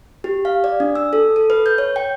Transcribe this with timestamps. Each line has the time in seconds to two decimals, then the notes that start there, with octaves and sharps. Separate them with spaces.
0.24 G4
0.45 F5
0.64 D5
0.80 D4
0.95 E6
1.13 A4
1.36 A4
1.50 B4
1.66 G6
1.78 C#5
1.96 G5